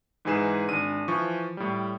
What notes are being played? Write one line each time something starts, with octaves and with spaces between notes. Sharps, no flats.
G#2 E3 D#4 G#4 B4 E7
G#1 D4 D#7
E3 F3 C#6
A2 G3